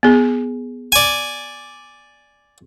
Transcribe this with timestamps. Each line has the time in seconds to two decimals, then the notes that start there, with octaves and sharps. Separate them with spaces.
0.03 B3 G#4
0.92 D5 G#5